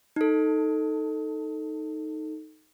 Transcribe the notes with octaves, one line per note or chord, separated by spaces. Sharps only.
D#4 A4